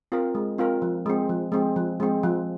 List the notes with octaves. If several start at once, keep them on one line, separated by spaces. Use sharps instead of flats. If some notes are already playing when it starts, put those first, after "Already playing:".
C4 F4 A#4
G#3
C4 F4 A#4
F3
G#3 C4
F3
G#3 C4
F3
G#3 C4
F3